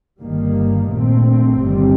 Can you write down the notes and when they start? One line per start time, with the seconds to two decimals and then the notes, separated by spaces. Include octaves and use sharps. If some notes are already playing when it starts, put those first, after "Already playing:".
0.21 G1 G2 D#3 G3 A#3
0.91 A#1 A#2 A3 C4
1.60 G1 G2 D#3 G3 C4